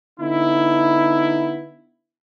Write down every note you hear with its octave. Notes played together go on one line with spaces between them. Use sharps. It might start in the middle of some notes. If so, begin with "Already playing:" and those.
D3 B3 D#4 E4